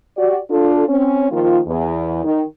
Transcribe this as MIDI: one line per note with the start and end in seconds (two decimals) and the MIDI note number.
0.17 0.39 66
0.17 0.39 67
0.17 0.39 74
0.51 0.85 62
0.51 0.85 65
0.51 0.85 69
0.88 1.29 60
0.88 1.29 61
1.31 1.60 51
1.31 1.60 53
1.31 1.60 58
1.31 1.60 65
1.67 2.21 40
2.24 2.43 51